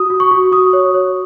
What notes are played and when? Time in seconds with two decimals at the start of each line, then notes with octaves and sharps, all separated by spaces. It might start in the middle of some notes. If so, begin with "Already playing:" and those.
Already playing: F#4 D#6
0.10 F#4
0.20 C#6
0.31 F#4
0.52 F#4 D#6
0.73 C#5
0.94 C#5